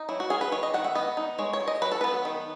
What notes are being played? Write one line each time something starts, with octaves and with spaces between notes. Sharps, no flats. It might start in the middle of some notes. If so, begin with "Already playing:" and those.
Already playing: D#4
F#3 E4
F#4
C#4 G#4
B4
D#3 C#5
D#5
D#3 F#5
E5
B3 D#5
D#4
G#3 C#5
C#5
G#3
D#5
F#3 B4
A4
B3 B4
D#3